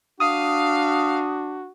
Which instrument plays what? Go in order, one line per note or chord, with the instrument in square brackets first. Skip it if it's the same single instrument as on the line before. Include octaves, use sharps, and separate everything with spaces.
[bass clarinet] D4 [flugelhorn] F#4 [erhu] F5 [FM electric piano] D#6